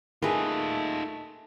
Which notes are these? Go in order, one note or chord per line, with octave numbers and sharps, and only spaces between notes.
A3 D#4 F4 G#4 A#4 B4